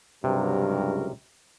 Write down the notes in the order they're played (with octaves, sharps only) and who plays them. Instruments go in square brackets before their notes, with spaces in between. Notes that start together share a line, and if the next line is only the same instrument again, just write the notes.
[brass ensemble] C#2 F#3 A#4 [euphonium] G2 [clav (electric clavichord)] C3